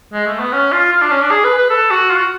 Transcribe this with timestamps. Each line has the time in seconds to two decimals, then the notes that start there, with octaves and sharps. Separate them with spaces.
0.13 G#3
0.27 A3
0.39 B3
0.52 C#4
0.72 F4
0.92 F4
1.02 D4
1.11 C#4
1.22 D4
1.31 G#4
1.45 B4
1.57 B4
1.70 A4
1.91 F#4
2.10 F4
2.18 F#4